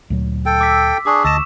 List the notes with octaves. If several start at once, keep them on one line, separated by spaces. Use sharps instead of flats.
D2 A#2 F#3
A4 G5
D6 E6 B6
D4 G#4 C#6 D6
D2 D#5 A5 E6 E7